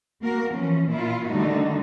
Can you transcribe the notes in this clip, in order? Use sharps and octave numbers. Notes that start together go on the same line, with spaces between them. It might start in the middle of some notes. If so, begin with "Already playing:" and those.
A#3 F#4 A#4
E3 F3 C#4
A#2 E4 F4
D3 D#3 G3 A3 D#4 F#4